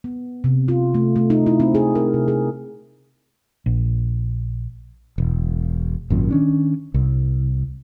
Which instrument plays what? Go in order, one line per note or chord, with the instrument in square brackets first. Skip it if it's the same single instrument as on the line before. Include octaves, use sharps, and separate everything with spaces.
[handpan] B3
C3
F4
A3
A3
D#4
E4
C4
G#4
A#4
C3
G#4
[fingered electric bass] A#1
[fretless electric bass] E1
G#1 F#2 A#2
D#3 C#4 D4
C2